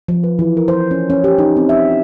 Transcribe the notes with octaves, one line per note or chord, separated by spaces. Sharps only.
F3
B4
E3
A#4
C5
C#4
C#4
G4
D#4
C4
E5
F4